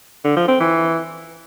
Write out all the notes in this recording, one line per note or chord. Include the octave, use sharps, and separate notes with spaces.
D3
F3
C4
E3